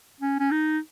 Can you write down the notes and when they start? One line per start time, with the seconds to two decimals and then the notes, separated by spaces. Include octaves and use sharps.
0.20 C#4
0.39 C#4
0.51 D#4